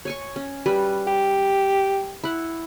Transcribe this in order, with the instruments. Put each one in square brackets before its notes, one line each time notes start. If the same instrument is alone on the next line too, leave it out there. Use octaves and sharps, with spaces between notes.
[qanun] C#5 G#5 C#6
C#4
G3 B4
[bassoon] G4
[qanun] E4 F#5